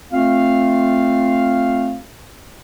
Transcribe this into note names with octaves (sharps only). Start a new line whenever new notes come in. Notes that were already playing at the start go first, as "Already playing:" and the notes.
A3 C4 F4 F5